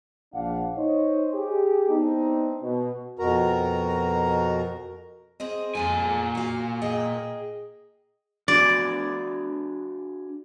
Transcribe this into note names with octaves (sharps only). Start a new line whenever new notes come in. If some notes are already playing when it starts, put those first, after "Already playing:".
A#1 D4 F5 F#5
D#4 C5 C#5 D#5
G4 G#4
B3 C4 D4 D#4
B2
F2 B2 F#4 A#4 A#5
C4 G#4 D#5
F2 A#2 G#3 A4 G#5
F#4 F5
G#4 D#5 G5
D4 F#4 G#4 D5